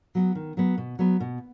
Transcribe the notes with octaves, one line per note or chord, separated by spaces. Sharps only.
F#3 B3
D#3
F#3 B3
B2
F#3 B3
B2